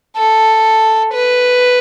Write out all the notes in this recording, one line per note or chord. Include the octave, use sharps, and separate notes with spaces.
A4
B4